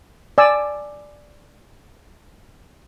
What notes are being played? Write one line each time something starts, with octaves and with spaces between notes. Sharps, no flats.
D5 G#5 E6